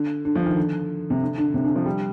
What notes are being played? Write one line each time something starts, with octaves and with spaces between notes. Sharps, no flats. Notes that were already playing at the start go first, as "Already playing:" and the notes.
Already playing: D3
D3
F3
D#3
D3
C3
D3
D3
C3
D3
F3
G3